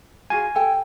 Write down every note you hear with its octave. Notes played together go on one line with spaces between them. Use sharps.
F4 F#4 G#4 G#5
G4 A4 G5